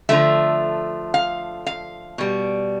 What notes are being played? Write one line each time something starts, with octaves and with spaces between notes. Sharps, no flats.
D3 F3 A3 E5
F5
F5
B2 G3